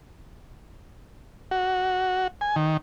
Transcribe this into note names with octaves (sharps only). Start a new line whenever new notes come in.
F#4
G#5
D#3